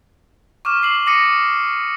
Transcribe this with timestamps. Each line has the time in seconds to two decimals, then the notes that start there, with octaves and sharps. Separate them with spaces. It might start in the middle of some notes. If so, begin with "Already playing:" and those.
0.65 C#6 D6 F6 E7
0.82 D6 C7 F#7
1.07 D6 D#6 A#6 C#7 D#7